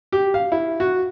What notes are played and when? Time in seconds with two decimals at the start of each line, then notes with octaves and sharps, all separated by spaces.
0.12 G4
0.34 F5
0.52 E4
0.80 F#4